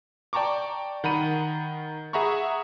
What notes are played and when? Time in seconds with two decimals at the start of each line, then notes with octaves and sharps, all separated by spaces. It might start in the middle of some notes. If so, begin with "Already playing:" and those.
0.33 D5 G5 A5 A#5 C#6 D6
1.04 D#3 F#5 A#5 B5 D#7
2.13 G#4 E5 F#5 A#5 B5 C#6